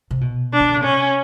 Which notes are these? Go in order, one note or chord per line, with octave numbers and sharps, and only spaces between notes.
C3
B2
D4
D#3
D3
C#3
C3 C#4